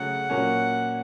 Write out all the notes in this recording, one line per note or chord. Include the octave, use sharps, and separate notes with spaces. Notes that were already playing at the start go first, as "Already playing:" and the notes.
Already playing: C#3 F#3 A3 C#4 F#5
A#2 F#3 A#3 C#4